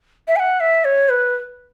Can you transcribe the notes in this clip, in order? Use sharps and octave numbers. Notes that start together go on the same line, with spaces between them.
E5
G#5
F#5
E5
C#5
B4